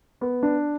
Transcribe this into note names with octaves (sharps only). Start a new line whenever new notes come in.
B3
D4